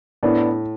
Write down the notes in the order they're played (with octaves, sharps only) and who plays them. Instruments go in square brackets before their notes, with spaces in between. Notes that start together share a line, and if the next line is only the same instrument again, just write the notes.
[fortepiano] A2 [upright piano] B3 D4